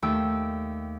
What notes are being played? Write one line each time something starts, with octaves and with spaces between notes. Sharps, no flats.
D#2 A3 G5 E6